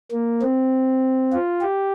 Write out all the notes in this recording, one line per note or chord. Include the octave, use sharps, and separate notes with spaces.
A#3
C4
F4
G4